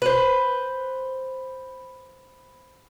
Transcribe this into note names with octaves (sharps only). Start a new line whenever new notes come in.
B4 C5